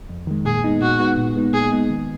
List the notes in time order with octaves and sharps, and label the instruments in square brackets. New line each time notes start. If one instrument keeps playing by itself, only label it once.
[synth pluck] F2
D#3 G#3
[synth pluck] A#2 [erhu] G#4
[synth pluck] G#3 B3 D#4
[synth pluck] A#2 [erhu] F#4
[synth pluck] G#3 B3 D#4
A#2
G#3 B3 D#4
[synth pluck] A#2 [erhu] G#4
[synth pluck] G#3 B3 D#4
D#3